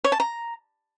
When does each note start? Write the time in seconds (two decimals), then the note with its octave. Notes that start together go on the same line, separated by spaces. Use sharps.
0.04 C#5
0.12 A5
0.20 A#5